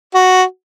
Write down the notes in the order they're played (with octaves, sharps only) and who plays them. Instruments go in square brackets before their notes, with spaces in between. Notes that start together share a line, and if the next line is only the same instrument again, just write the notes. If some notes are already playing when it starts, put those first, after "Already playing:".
[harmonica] F#4